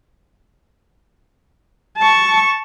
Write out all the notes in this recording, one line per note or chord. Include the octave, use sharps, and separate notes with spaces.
A5 C#6